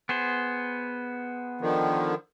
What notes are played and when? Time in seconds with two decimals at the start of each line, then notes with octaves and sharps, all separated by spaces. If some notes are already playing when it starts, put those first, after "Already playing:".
0.09 B3 G#4 C5
1.61 D3 D#3 F3